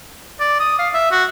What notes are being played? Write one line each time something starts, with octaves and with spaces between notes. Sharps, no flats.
D5
D#6
F5
E5
F#4